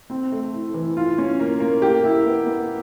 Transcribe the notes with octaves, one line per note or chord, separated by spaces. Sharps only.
C4
A3
E4
E3
F4
C#4
A#3
A#3
G4
E4
B3
B3